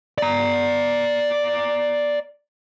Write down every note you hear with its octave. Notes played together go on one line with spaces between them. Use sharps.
D5 A#5